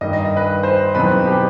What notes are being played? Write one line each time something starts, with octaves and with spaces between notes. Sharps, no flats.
G2 D#3 G3 D#5
D#5
D#5
B4
C5
E2 B2 F#3 C4 D#4 B4
G4